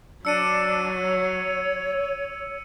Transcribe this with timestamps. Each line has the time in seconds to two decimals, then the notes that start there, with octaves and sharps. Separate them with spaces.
0.25 F#3 D4 E6 C#7 D#7
0.99 C#5